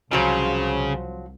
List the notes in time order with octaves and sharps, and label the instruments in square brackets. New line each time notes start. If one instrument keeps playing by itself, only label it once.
[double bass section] C2 [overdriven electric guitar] C#3 [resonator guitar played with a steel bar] F3 F#3 C5